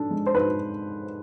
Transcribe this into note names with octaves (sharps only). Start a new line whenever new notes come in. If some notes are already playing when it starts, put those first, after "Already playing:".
Already playing: G#2 D4 A4
G#3
C5
G#2 B4